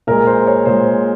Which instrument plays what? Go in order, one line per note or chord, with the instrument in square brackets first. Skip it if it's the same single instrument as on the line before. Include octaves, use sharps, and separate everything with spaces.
[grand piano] A#2 G#3 A#4
C5
C#5
A#2 G#3 C5